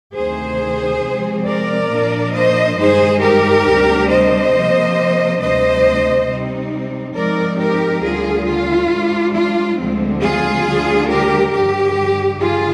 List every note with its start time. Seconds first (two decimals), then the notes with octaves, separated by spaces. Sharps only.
0.15 D2 C3 D#3 G#4 C5
1.03 C3 F3 G#3 C4
1.47 A#4 D5
1.90 A#2 F3 A#3 D4
2.34 C5 D#5
2.77 G2 D#3 G#3 D#4 G#4 C5
3.21 G4 A#4
3.65 D2 C3 G3 D4
4.08 C5 D#5
4.53 C3 F3 A#3
5.40 D2 C3 G3 D4 C5 D#5
6.27 C3 G3 C4 D#4
7.15 G#2 F3 G#3 C4 D#4 A#4 D5
7.58 G4 A#4
8.03 D2 D3 G3 F4 G#4
8.47 F4
8.90 G#2 G3 D4
9.34 F4
9.78 D2 D3 F3 G#3 C4
10.21 F4 G#4
10.65 D2 D3 G3 D4
11.08 G4 A#4
11.53 G2 D3 F3 G4
12.40 G2 D3 F4 G#4